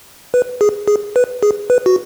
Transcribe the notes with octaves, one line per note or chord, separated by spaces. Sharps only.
B4
G#4
G#4
B4
G#4
B4
F#4